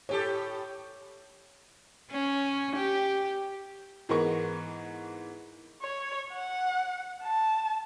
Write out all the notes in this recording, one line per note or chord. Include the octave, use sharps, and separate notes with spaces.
A2 G4 A4 C#5
C#4
G4
G#2 E3 G#3 B3 A#4 C#6
C#5
F#5
A5